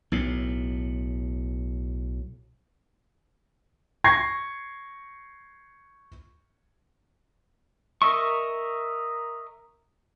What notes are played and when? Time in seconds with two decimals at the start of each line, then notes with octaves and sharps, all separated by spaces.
0.12 B1 A2
4.04 C#6 G#6 A#6 C7
8.02 A#4 D#5 E5 C#6